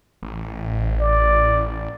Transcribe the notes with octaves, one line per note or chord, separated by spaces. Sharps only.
A1
D5